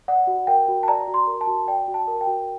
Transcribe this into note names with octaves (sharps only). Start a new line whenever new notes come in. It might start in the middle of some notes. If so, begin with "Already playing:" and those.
D5 F#5
F#4
A#4 G5
F#4
A5
D5 A#5
F#4
C6
A#4
A5
F#4
D5 G5
F#4
A5
A#4
G5
F#4